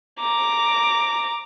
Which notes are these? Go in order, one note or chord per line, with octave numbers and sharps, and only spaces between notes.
A#5 D6